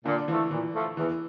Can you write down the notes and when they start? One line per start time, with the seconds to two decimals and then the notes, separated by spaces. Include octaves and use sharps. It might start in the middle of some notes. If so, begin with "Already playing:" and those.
0.05 A#2 D3
0.28 E3 F3 A3
0.51 A#2 E3
0.74 F3 A3
0.97 E2 E3